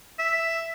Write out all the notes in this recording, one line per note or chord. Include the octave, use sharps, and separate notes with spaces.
E5